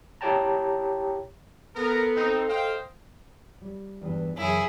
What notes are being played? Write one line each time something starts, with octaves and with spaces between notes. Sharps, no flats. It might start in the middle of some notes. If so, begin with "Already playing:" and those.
E4 G4 C#5 G5 A5 A#5
B3 A4 A#4 A#5
C4 D#4
C5 D#5 F5 G5
G3
E2 G2 E3
F#2 C#3 E3 E4 G#4